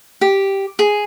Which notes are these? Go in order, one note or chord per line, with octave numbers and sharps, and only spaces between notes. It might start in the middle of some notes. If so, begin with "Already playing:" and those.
G4
G#4